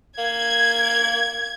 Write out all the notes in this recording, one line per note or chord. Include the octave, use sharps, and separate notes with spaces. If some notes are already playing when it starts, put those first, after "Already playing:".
A#3 G#6